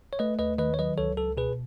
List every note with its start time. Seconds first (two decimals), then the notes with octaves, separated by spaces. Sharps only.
0.13 C#5
0.19 A3 B4 D#5
0.39 D#2 B4 D#5
0.58 D#3 B4 D#5
0.74 C#5
0.79 F#3 B4 D#5
0.98 C#2 A4 C#5
1.17 C#2 A4
1.37 B2 G#4 B4